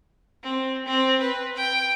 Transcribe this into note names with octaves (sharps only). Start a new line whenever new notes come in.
C4
C4
B4
G5